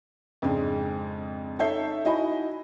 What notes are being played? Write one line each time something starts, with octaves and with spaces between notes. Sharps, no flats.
F2 G#2 C#3 G#3 D4
D#4 A4 C#5 E5 G6 C7
D#4 E4 F#4 D#5 G#5 B5